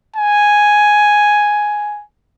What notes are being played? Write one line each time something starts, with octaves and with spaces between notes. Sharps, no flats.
G#5